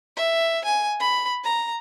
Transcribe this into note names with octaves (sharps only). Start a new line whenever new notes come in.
E5
G#5
B5
A#5